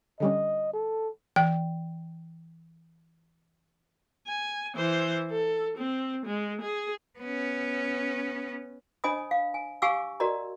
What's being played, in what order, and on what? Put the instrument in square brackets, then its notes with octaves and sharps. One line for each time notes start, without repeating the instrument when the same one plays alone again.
[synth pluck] D3 G3 C#4 [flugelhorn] D#5
[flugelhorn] A4
[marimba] E3 [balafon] G5
[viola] G#5
E3 C5
A4
C4
G#3
G#4
[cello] B3 C#4
[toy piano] D4 C5 D#5 G#5 B5 D#6
F5
G#5
G4 F5 G#5 C#6 D6 E6
F#4 A#4 D5 D#5 A#5